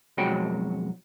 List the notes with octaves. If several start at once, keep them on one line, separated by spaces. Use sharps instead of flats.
B1 F2 G#3 F#4 C#5 G5